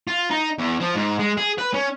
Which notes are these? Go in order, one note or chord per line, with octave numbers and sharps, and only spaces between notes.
F4
D#4
E2
F3
G#2
G#3
G#4
B4
C#4